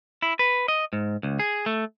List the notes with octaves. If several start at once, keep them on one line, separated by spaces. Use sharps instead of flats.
E4
B4
D#5
G#2
C#2
G#4
A3